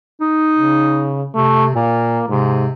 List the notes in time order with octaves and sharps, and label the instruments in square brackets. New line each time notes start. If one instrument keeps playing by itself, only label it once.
[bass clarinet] D#4
[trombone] C#3
[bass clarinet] C3 [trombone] A3
[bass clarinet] A#2 [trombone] A#3
[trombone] G#2 [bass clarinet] C3